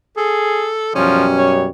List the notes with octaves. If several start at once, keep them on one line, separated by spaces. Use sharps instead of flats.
G#4 A4
F#2 B2 F3 G3 C#4
C#5